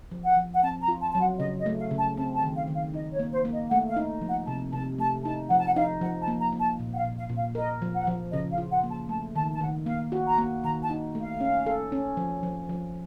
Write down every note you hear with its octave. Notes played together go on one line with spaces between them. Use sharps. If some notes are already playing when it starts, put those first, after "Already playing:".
F3
F#5
F3
F#5
C4 A5
A#5
F4
A5
F#3 A5
F#5
C#3 D#5
D#5
A3
F5
C#3
A5
C4 A5
A5
D#3
F5
D#3
F5
D#4 D#5
C#5
A#3
C5
A#3
D#5
A3 F#5
F5
D#4
F3
F#5
C3 A5
C3 A5
A3 A5
D#4 A5
F3 F#5
A5
F#5
D#4 F5
F3 F#5
A5
A#3
A#5
A#3
A5
A#2
F#5
F5
A#2
F5
A#2
F5
A#4 D#5
F3
F#5
F3
C#3 D#5
F5
F4
F#5
A#3
A5
A3 A5
D#3 A5
A5
D#3 F#5
A#3 F5
F#4
A#5
A#3
D#3 A#5
A5
D#4
A3
F5
C#4
A4
C#4
F3
F3
F3